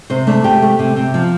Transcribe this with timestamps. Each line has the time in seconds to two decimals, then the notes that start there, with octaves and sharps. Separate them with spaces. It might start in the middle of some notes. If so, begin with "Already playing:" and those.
0.10 C3 C5
0.27 A3 D4
0.44 C3 G4
0.62 A3
0.79 C3
0.96 C3
1.14 F3